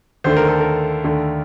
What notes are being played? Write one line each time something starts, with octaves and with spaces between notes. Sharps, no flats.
D#2 D3 A3 C5
A#4
A4
A#4
D#2 D3 A3